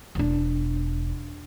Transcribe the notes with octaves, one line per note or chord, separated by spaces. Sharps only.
E1 D4